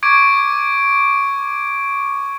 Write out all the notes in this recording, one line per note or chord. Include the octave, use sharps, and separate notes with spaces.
C#6 D6 G#6 D7